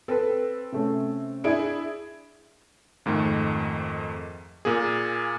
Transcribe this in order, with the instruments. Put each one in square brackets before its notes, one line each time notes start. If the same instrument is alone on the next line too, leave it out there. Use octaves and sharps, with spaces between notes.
[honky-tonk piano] C4 [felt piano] A4 B4
[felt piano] C3 A3 C#4
[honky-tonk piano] D4 E4 G#4 [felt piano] G#6 D7
[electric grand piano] F2 G#2 D#3 A3
A#2 A#3 G#4